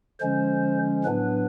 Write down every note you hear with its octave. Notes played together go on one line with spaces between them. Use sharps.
D3 F3 G#3 C#4 C5
A2 F#3 B3 D4 B4